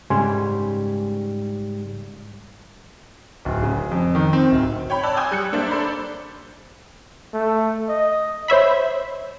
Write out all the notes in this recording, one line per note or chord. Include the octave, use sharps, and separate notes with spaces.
G#2 C#3 G3 G#5 C6
D1
C#3
F2
D#3
C4
D1
C#5 G5 B5
C#5 D5 A5 E6 F#6
G5 G#5 C6 D#6 G6 G#6
G3 F#6 C#7
A#3 D4 C5 D5 E5
A4 C5 D5 B5
A3
D#5
C5 C#5 E5 B5